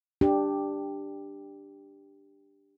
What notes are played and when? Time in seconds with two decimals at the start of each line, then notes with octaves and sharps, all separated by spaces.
0.21 D4 G4